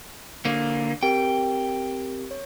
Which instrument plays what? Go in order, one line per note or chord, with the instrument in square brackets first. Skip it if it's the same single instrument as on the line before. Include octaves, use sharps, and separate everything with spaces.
[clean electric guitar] D3 A#3
[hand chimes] C4 G4 A#4 [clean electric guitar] G5
[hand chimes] C#5